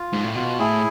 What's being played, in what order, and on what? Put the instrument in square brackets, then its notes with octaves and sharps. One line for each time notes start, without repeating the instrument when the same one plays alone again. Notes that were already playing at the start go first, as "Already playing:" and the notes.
Already playing: [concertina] F4
[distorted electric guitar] G#2
A2
[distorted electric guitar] B2 [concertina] F4
[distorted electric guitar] A2 [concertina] E4 G#4